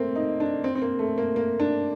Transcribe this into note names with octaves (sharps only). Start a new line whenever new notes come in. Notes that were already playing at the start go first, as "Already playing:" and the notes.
Already playing: A3 A#3 C4
D#4
D4
C4
C4
A#3
A3
A#3
A#3
D4